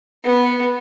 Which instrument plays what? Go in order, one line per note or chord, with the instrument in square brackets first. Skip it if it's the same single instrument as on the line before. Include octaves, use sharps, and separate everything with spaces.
[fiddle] B3